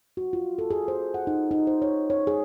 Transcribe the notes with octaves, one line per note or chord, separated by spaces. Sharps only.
F#4
F4
A4
G#4
C5
F#5
D#4
D#4
C5
C#5
C#5
G#4